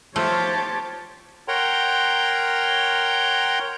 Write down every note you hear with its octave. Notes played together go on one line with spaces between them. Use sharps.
F3 A3 G4 C5 C#5 A5
A#4 C#5 F#5 G5 A#5 C6